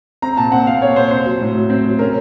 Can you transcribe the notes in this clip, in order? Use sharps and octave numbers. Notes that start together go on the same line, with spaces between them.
C4 A#5
A#2 A5
C4 F#5
A#2 F5
A#2 C#5
A#2 C5
C4 C5
F#3
A2
F#3
C4
F#3
C#4 A#4